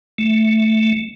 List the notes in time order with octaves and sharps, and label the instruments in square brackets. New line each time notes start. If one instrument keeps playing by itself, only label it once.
[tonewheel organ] A3